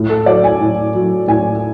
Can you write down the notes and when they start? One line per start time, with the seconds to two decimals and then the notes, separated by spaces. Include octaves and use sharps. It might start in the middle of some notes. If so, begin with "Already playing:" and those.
Already playing: A2
0.09 A4
0.26 F#3 D5
0.44 G#5
0.60 A2
0.94 F#3
1.27 A2 G#5